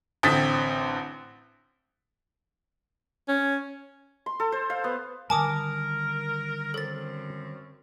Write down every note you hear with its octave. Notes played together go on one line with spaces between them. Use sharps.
A1 D3 C4 D#6 A6 B6
C#4
C6
A4
C5
F5
B3
D3 D#3 G3 A#4 G#5 A5 D6 D#6
F#2 C4 A4 A6